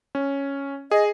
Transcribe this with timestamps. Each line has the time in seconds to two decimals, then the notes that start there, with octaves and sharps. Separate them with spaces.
0.15 C#4
0.91 G#4 D#5